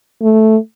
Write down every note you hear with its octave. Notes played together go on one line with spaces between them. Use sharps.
A3